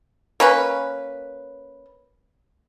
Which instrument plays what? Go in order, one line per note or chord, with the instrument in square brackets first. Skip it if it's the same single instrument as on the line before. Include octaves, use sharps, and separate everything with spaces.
[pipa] A#3 C#4 B4